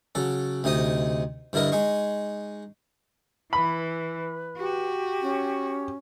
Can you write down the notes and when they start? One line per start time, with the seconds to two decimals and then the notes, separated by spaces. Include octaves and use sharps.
0.15 C#3 F#3 A4
0.64 D2 C3 D#4 D#5 D#6
1.53 G2 D3 E4 A#4 D#5
1.72 G#3 D#4 C#6
3.53 E3 B4 B5
4.58 F#4 G4
5.22 C#4